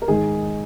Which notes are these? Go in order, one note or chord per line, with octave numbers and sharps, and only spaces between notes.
A#4
G#2 D#3 G#4